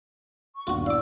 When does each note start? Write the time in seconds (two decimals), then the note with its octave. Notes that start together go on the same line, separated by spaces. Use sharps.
0.56 C#6
0.67 D#1 B1 G2 F4 F#4
0.86 E4 D5 F5 D6 E6